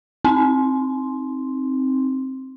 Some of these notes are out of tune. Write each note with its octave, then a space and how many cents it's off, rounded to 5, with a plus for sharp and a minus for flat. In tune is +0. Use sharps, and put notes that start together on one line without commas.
C4 +10 D#4 +5 C6 +0